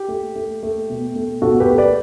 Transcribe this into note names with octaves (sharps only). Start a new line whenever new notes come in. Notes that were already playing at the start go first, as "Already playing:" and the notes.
Already playing: G4
A3
A3
A3
B2
A3
B2 F#4 A4
G4 B4
A3
B4 D5